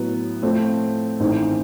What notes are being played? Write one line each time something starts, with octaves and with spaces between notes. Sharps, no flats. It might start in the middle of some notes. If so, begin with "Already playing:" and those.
Already playing: A2 F#3 B3
A2 F3 A3 C4
A1 G#2 D#3 G#3 C4